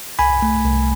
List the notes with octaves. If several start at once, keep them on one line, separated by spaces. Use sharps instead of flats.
C2 G#5 B5
A3
C2